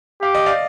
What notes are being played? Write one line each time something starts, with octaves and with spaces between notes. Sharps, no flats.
G4 F5
D#5
D5 F5